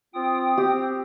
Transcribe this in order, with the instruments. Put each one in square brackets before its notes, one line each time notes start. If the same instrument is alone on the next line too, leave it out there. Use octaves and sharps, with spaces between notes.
[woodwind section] C4 F4 [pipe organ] G5 D#6
[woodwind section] C4 [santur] G4